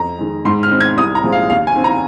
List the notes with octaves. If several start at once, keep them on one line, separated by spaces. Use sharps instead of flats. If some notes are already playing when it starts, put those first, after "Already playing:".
Already playing: F2 A#5
D#3 G#3
G#2 C6
F6
D#3 C4 D#4
G#6
C2 D#6
A#5
A#2 F3 G#3 C4
F5
D#2 F5
G#5
D#3 C4
A#5